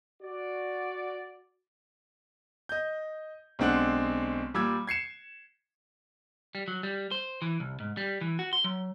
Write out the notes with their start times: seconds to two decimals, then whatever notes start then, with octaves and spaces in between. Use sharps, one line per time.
0.23 F#4 D5
2.69 D#5 G6
3.59 B1 G#3 C4 D4 F#5 F#6
4.54 A#2 G3 D6 E6 G#6
4.87 G#6 C7 C#7 E7
6.55 G3
6.68 F#3
6.83 G3
7.11 C5
7.42 E3
7.60 C2
7.80 G#2
7.97 G3
8.21 E3
8.39 F#4
8.53 C6
8.64 F#3